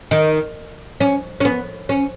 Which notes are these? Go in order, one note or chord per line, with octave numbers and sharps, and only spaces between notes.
D#3
C#4
C#4
B3
C#4